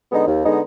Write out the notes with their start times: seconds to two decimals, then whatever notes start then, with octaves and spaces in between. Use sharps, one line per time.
0.11 D3 G#3 B3 D#4
0.27 D#2
0.44 D3 G#3 B3 D#4